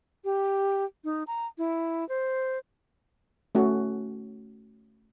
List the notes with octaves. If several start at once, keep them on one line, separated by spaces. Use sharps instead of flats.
G4
D#4
A#5
E4
C5
A3 C#4 F#4